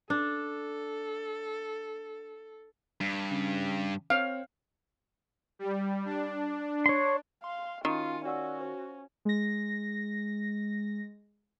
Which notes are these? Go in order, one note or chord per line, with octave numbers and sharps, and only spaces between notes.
D4 A4
G2
C#3
C4 C#5 F5
G3
D4
C#5 C6
F5 C6
D#3 C#4 F4 F#4 C#7 D#7
C#4 F#4 D5 F#5 E6
C5
G#3 A#6